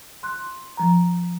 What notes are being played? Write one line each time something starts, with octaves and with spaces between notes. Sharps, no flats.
C6 F#6
F3 A#5